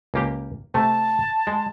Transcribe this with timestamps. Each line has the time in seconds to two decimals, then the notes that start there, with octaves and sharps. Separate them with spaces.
0.14 C#2 A#3 G4
0.74 C3 A3 A5
1.47 G#3